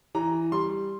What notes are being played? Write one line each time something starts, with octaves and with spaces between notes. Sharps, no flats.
E3 A#5
G3 C6